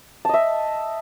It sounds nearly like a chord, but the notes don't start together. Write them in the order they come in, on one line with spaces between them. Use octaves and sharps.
A5 D#5 E5